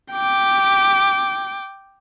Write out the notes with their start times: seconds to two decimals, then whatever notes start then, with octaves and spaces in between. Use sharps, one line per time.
0.12 G5 D6